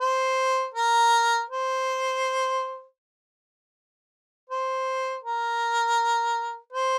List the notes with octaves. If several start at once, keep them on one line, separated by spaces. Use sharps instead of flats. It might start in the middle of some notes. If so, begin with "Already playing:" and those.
C5
A#4
C5
C5
A#4
C5